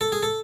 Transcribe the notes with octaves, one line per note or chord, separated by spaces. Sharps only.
A4
G#4
A4